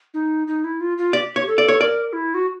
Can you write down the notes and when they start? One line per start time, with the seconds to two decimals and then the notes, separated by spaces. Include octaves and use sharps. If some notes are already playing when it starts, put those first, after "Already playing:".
0.14 D#4
0.47 D#4
0.64 E4
0.81 F4
0.98 F4
1.13 G4 D5
1.36 C#5
1.47 A4
1.58 D5
1.68 C#5
1.80 A#4 D5
2.13 E4
2.34 F#4